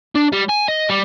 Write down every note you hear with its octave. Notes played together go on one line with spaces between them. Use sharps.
D4
G3
G#5
D#5
G3